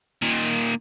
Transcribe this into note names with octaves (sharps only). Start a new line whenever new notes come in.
A#2 D#3